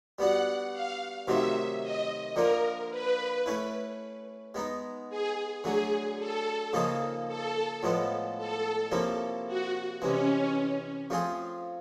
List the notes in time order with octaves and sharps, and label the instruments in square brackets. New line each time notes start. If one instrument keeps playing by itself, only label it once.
[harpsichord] G3 B3 D4 F#4 [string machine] F#5
[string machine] F5
[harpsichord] C3 D#3 F#3 A3 C4 [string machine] E5
[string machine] D#5
[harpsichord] D3 F3 A#3 D4 [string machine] A#4
[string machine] B4
[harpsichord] A3 C#4 E4
G#3 B3 D#4
[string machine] G#4
[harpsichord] D3 F#3 A3 [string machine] G#4
[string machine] A4
[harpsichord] C#3 F3 A#3 D#4 G#4
[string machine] A4
[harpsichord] A2 F3 G#3 B3
[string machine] A4
[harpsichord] C3 F3 A#3 C#4 E4
[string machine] F#4
[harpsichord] C3 E3 G#3 [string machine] C#4
[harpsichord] F3 A3 C4 F4 G#4